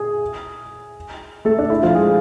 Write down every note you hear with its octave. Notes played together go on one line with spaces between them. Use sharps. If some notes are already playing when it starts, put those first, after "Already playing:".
Already playing: G#4 G#5
A3 A4
D4
E4
F3 F4
G#3 G#4